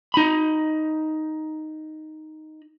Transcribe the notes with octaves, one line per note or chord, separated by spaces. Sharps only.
D#4 B5